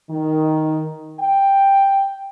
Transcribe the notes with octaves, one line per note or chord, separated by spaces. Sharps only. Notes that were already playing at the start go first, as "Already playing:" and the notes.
D#3
G5